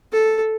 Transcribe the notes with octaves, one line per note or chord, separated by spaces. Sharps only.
A4